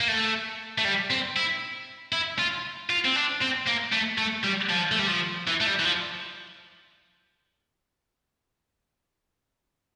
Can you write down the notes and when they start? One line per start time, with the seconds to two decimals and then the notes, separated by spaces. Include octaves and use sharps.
0.01 A#3
0.08 A3
0.78 A3
0.85 G3
1.10 C4
1.36 E4
2.13 E4
2.39 F4
2.90 F4
3.05 C4
3.15 D4
3.41 C4
3.66 A#3
3.92 A3
4.18 A3
4.44 G3
4.70 F3
4.92 A3
4.99 G3
5.08 F3
5.47 E3
5.60 A3
5.67 G3
5.79 E3
5.85 F3